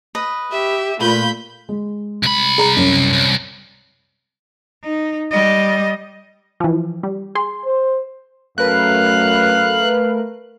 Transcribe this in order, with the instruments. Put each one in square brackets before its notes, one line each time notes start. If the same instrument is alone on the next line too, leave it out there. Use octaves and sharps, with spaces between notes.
[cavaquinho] B4 D#5
[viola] G4 [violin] E5
[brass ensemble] A#2 F4 [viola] A3 [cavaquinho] B4 [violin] B5 G6
[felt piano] G#3
[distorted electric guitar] C2 B5
[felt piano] G#4 A#5
F#2
[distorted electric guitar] C2
[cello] D#4
G3 D#5
[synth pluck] E3 F3
G3
G#4 C6
[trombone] C5
[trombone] F#2 [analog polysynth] A3 A#4 B4 [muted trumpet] F5 [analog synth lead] F#6